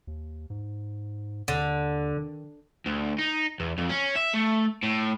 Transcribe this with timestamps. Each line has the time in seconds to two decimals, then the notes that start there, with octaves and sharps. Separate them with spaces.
0.07 D#2
0.50 G#2
1.48 D#2 D3
2.17 D#3
2.86 D2
3.18 D#4
3.60 E2
3.78 F2
3.90 C#4
4.16 E5
4.34 A3
4.83 A2